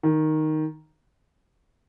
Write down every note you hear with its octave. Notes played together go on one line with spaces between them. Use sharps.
D#3